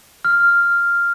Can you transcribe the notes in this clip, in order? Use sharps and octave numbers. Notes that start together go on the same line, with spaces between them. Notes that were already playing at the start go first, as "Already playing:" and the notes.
F6